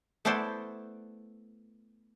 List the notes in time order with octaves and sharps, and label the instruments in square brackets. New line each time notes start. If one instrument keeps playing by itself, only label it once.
[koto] A3 B3 E4 A4 C5 D5